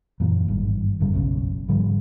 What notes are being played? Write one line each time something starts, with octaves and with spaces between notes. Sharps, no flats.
F#2 A#2 E3
G#1 G2
G1 F#2 C#3 G3
F#1 B1 F#2 C#4
G#2 D3 F3 G3